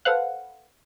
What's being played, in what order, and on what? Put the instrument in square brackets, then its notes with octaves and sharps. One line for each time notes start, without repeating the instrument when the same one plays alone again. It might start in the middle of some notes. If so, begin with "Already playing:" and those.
[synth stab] A4 B4 C5 F5 F#5